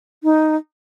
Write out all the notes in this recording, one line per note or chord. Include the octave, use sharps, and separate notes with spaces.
D#4